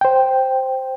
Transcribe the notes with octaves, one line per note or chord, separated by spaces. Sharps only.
C5 G5